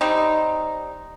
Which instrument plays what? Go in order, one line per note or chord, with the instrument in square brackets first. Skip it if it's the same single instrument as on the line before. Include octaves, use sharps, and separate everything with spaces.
[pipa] G3 C4 D#4